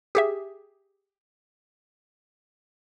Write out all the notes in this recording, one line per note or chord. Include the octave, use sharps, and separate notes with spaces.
G4 G#4 E5